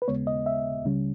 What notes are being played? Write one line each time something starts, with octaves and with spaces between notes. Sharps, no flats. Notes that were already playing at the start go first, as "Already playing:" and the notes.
B4
D#2 C#3 G#3 B3 C#5
D#5
E5
C#2 C#3 G3 C#4